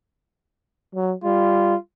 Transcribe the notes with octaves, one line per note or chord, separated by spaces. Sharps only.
F#3
G3 F4